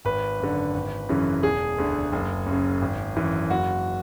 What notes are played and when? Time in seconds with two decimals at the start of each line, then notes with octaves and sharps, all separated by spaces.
0.05 G#1 B4
0.40 F#2 D3
0.74 G#1
1.09 F#2 C#3 E3
1.43 E1 G#4
1.78 D2 D3
2.12 F#1
2.46 F#2 C#3
2.82 G#1
3.16 F#2 E3
3.50 F#1 F#4